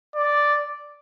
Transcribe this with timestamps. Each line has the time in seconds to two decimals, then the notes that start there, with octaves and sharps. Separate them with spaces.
0.15 D5